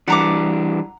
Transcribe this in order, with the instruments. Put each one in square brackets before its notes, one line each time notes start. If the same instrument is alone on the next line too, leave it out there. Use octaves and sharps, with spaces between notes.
[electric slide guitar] E3 G3 D4 [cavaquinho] F#5 A#5 D6